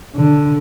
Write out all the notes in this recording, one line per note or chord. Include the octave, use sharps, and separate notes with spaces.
D3